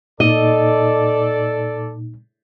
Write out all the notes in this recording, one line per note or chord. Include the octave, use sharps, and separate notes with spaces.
A#2 D#4 A4 D5 D#5